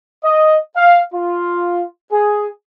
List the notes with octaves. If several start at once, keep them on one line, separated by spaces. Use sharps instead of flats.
D#5
F5
F4
G#4